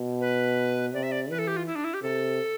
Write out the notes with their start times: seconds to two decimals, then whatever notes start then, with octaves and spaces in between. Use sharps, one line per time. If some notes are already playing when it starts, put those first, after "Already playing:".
Already playing: B2
0.21 B4
0.93 C3 D5
1.03 E5
1.12 D5
1.30 E3 B4
1.39 A4
1.47 G4
1.57 F4
1.67 E4
1.75 D4
1.84 E4
1.94 G4
2.02 C3 A4